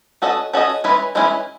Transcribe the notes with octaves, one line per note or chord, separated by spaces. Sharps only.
C#4 F#4 A4 D#5
C#4 F#4 A4 D#5
E3 G#3 C#4 E4 B4
E3 G#3 C#4 E4 B4